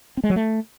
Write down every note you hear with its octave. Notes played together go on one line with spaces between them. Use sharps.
C4
G#3
F#3
A3